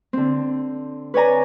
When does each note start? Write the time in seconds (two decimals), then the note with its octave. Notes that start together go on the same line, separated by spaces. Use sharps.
0.13 D3 C4
1.14 B4 C#5 D5 G#5 A#5